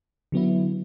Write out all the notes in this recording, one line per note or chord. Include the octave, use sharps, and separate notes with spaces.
D3 F#3 B3 E4